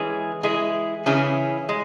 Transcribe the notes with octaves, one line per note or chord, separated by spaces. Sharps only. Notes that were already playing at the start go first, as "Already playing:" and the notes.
Already playing: E3 G#3 C#4 G#4
E3 G#3 E4 G#4
C#3 E3 C#4 E4 G#4
G#3